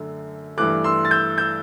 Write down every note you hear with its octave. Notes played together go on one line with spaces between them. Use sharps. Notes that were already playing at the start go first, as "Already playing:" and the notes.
Already playing: F#2 D3 A3
G2 E3 A3 D6 F#6
C6 E6
A6
E6 G6
E6 G6